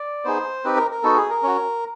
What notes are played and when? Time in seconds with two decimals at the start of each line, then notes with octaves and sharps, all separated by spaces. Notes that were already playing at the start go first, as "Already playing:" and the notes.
Already playing: D5
0.25 B3 D#4 G#4 C5
0.64 C4 D#4 G4 B4
0.77 A#4
0.91 A#4
1.03 B3 D#4 F#4 A4
1.17 G#4
1.29 A#4
1.43 C#4 F#4